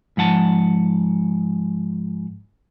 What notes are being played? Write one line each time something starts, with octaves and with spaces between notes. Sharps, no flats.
G#2 F3 F#5 A5